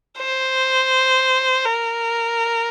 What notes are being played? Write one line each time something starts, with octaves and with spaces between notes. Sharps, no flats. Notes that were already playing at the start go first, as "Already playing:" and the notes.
C5
A#4